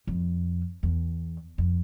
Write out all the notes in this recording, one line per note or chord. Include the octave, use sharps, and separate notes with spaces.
F2
E2
F2